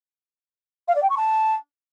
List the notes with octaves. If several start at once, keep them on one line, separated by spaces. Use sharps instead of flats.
F5
D5
G5
C#6
A5